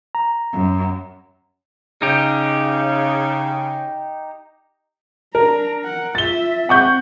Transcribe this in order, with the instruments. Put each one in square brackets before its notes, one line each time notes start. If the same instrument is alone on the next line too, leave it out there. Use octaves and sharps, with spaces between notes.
[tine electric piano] A#5
[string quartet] F#2
[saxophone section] C#3 [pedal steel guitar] D#4 G4
[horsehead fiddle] D4 A#5 [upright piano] A#4
[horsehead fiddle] F#5
[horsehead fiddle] F4 E5 [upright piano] A6 G7
[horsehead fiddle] C4 [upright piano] F#5 C#6 G6